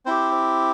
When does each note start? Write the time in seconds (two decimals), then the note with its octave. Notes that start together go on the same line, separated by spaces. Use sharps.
0.06 C4 E4 G4 C5